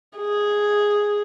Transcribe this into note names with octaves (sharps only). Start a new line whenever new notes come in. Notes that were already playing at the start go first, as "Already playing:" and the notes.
G#4